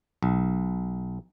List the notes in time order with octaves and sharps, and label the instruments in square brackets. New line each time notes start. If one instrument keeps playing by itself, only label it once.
[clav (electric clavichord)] B1